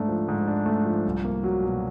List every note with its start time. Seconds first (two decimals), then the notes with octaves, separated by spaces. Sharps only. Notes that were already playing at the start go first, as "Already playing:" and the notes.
Already playing: G#2 A3 D4
0.08 F3
0.28 G#2
0.48 D4
0.66 A3
0.86 F3
1.06 C2
1.25 A#3
1.44 F#3
1.63 B2